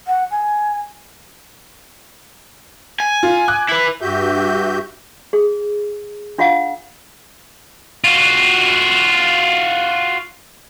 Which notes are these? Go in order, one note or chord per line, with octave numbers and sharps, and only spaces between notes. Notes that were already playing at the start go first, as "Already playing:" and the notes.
F#5
G#5
G#5
F4
D6 F#6
E4 B4
G2 F#4 G4 E5 G6
G#4
D4 F4 F5 F#5
F4 F#4